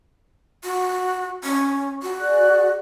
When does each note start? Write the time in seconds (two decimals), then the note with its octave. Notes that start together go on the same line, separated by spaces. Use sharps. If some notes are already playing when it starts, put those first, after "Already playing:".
0.64 F#4
1.44 C#4
2.03 F#4
2.20 G#4 D5 F#6